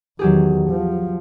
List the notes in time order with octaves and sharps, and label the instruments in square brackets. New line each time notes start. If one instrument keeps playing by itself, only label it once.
[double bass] E2 D#3 [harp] F#3 G4 G#4
[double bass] F3